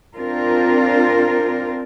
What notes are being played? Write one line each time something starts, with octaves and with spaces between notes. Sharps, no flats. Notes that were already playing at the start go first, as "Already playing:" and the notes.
C4 D4 F4 A#4